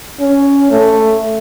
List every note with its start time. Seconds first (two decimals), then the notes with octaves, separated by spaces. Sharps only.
0.20 C#4
0.71 A3